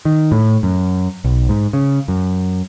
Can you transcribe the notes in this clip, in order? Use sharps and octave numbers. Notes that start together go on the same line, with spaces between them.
D#3
A2
F#2
B1
G#2
C#3
F#2